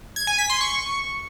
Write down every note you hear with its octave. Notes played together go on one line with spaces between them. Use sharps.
G#6
G#5
B6
C6
C#6